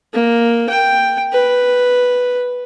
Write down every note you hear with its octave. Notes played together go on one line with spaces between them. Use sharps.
A#3
G5
B4